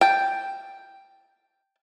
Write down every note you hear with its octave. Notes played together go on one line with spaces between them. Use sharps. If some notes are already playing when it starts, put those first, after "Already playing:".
G5 A5